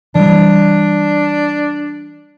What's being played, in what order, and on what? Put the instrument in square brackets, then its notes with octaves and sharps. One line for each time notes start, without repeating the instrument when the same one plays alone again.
[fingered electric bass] E3 G3 [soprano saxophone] D4